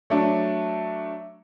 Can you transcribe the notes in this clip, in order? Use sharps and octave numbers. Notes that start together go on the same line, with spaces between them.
F#3 A3 D4